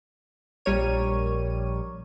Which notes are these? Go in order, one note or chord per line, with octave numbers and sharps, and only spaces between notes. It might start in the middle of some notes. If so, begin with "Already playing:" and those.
A#1 G3 A#4 C#5 D#7